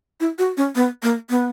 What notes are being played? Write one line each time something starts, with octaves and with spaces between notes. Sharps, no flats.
E4
F#4
C#4
B3
A#3
B3